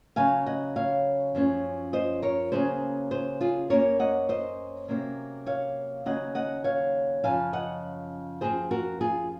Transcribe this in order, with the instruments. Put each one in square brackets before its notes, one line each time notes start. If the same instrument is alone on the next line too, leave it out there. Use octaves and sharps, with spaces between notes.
[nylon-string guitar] C#3 F#3 C#4 F5 G#5
D#5 F#5
C#5 F5
F#2 F3 G#3 C#4
C5 D#5
A#4 C#5
C#3 F#3 A#3 C#4 G#4 C5
G#4 C5
F4 G#4
F#2 F3 A#3 C#4 A#4 C#5
D#5 F#5
C5 D#5
C3 F#3 A#3 C#4
C#5 F5
D#2 C#3 F#3 C#4 D#5 F#5
D#5 F#5
C#5 F5
F#2 C#3 F3 F5 G#5
D#5 F#5
F#2 F3 C4 G#4 C5
F#4 A#4
F4 G#4